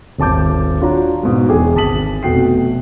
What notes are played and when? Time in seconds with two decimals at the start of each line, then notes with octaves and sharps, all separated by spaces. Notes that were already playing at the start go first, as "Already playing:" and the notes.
0.18 D#1 G#1 A5 D6 G6
0.81 D4 F4 F#4 C#5 A#5
1.23 G#2 B2
1.49 E1 E3 G#4 G5 D6
1.75 G#1 A5 D#6 B6 F#7
2.23 F1 B2 F#4 G5 C7